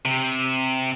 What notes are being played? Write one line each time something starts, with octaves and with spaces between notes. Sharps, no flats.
C3